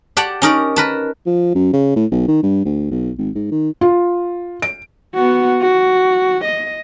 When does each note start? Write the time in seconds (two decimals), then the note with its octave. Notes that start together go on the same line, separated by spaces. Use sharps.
0.17 G4 D5 F#5 A5
0.42 C#4 D#4 A#4 D5
0.76 A#4 B4 A5
1.26 F3
1.55 F#2
1.73 C#3
1.96 A2
2.11 B1
2.28 D#3
2.43 G2
2.65 D2
2.91 B1
3.18 G#1
3.35 G#2
3.51 D#3
3.81 F4
4.62 D7
5.15 B3 F#4
5.62 F#4
6.45 D#5